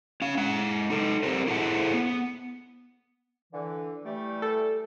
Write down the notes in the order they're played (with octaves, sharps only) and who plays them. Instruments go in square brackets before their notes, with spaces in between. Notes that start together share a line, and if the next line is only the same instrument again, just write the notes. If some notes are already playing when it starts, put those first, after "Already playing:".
[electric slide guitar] C#4 F5
G#3 F#5
D#4 A4 D#5
C4 C#4 G4 A#4 C5
E4 G#4 A4 C5 F#5
B3
[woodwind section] D3 E3
E3 G3 A3
[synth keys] A4